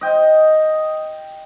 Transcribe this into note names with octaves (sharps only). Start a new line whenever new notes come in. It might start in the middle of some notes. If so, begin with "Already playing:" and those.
D#5 G5